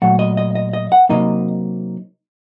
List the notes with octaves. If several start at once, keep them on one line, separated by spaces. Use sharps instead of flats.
A#2 F#3 A3 F#5
D#5
D#5
D#5
D#5
F#5
C3 F#3 A#3 D#4 D#5